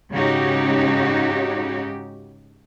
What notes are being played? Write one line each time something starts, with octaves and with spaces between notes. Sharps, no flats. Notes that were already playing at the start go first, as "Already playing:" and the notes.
G#2 C#3 C#4 D#4 F#4 G4